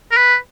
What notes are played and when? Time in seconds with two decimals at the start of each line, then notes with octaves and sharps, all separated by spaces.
0.11 A#4
0.17 B4